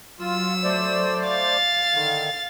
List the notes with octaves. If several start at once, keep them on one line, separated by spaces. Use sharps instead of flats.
F#3 F4 E6
A3 C5 D5
F5 A6
D3 D#3